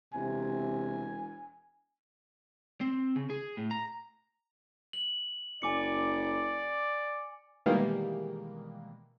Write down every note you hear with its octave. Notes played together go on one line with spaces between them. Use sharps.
E1 C3 G#5
C4
C#3
G#4
A2
A#5
F#7
F#1 D5 G#5 D6 C#7
B2 D#3 E3 G3 G#3 A#3